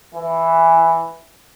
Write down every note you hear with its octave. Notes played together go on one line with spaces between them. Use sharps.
E3